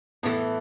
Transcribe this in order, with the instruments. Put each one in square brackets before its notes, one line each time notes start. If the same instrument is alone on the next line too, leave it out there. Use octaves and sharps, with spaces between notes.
[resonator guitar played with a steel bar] A2 E3 A3 [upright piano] B3